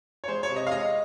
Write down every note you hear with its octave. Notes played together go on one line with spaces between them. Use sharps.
C#5
G#3 C5
C#5
C3
D#5
F5
G#3 D#5